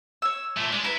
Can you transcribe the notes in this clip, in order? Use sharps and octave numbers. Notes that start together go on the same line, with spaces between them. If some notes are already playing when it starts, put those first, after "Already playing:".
C#5 E6
A#2 A3
G#3 D4
E4 B4 A#5 C6